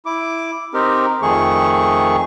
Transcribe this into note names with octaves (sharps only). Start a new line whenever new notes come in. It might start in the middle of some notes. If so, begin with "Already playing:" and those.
E4 D6
C4 D#4 G4 A#4
F2 D#3 A3 G#4 C#6